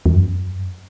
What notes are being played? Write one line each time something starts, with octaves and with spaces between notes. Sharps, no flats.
E2
F#2